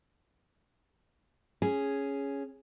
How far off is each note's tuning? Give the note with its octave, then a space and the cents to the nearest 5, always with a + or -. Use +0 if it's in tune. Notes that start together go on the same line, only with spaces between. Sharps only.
C#4 +0 G#4 +0